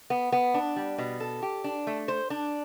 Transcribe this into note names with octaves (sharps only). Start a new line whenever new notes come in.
B3
B3
D4
G3
B2
A4
G4
D4
A3
C5
D4